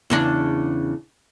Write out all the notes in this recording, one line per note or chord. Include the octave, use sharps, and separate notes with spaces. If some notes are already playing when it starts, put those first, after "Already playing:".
E2 C#3 D4